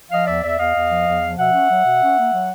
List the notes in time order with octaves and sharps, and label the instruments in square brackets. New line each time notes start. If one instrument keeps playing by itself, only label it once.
[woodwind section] F3 D#5 F5
E2 D5 E5
E2 D5 E5
E2 D#5 F5
E2
F3
E2
F3
B2 E5 F#5
C#4
F#3
B2
C#4
A#3
F#3